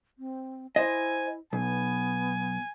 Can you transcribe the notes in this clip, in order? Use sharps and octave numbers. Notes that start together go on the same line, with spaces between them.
C4
E4 C5 D#5 G#5
B1 B3 G#5